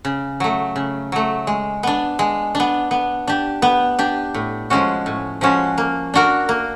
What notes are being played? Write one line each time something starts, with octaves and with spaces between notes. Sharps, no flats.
C#3
F#3 A3
C#3
F#3 A3
G#3
B3 D4
G#3
D4
B3
B3
D4 G4
B3
D4 G4
A2
F3 G#3 C#4 F#4
A2
F3 G#3 C#4 F#4
A#3
D4 F#4 A#4
A#3